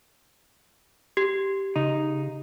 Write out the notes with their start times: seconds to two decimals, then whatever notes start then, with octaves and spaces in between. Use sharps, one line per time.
1.17 G4
1.76 C#3 D#4